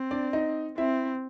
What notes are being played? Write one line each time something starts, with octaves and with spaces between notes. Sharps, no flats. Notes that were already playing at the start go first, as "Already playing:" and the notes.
Already playing: C4
D4 D5
D#4 D#5
C4 E4 E5